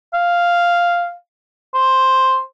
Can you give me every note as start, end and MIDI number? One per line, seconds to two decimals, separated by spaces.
0.14 1.12 77
1.74 2.40 72